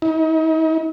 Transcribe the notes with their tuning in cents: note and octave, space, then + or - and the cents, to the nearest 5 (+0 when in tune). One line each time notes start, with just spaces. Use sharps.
D#4 +45